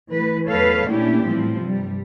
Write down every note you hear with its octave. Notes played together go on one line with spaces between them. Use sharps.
E3 A3 B4
E2 F#3 A4 B4 C#5 F5
A#2 A3 C#4 D4 E4 G4
A2 E3 F3 G3 C4
G2 C3 G3